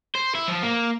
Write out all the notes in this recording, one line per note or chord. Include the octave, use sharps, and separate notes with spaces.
C5
E4
F3
A#3